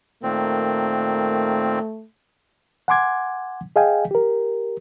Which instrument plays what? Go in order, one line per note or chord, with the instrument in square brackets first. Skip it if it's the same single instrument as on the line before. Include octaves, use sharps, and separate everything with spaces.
[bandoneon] A#2 D#3 C4 [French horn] A3
[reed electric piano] F#5 G#5 C6 D6 G#6
G#4 D#5 F5 G5 G#5
G4 A#4